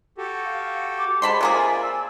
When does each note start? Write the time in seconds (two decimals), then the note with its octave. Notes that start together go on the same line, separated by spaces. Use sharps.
0.18 F#4 G4 A4
0.45 F5
0.98 D6
1.22 G#3 C5 A5 B5 C6
1.41 C3 A#3 F4 G#4 D5 G#5
1.82 E6